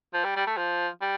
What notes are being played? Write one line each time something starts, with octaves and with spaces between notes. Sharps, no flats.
F3
G3
G3
A3
F3
G3